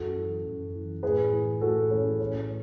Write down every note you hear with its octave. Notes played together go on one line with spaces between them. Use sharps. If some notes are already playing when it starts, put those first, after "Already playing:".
Already playing: F#2 F#4 A4
E3
F#2
E3
A2 G#4 B4
E3
A2 F#4 A4
E3 C#4
A2 C#4